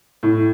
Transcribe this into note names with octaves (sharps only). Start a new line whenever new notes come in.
A2